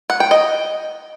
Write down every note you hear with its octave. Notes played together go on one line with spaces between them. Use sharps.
F#5
G5
D#5